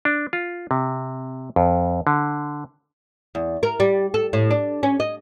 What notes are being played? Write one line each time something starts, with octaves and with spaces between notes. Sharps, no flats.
D4
F4
C3
F2
D3
E2
A#4
G3
A4
A2
D4
C#4
D#5